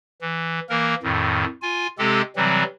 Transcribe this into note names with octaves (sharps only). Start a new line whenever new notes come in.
E3
E3 A#3 A#4
F2 A2 D#3
F4 G#5
C3 G#3 C4 G4 A4
C3 E3 F#3 G3 C4